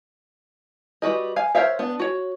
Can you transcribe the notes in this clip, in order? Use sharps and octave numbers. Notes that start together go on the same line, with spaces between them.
G3 F#4 B4 D#5
F5 G#5
A#4 C5 C#5 E5 F5
B3 D4
F#4 C#5